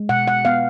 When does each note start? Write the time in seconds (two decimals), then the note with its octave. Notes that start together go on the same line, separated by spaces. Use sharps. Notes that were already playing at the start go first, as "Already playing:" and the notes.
Already playing: G#3
0.09 B2 F#5
0.28 F#5
0.45 B3 F5